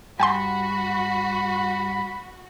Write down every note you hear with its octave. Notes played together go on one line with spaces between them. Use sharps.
G2 F#4 G5 G#5 B5 C6